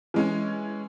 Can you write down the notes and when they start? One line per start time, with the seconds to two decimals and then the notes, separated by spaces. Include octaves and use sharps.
0.14 E3 G#3 C#4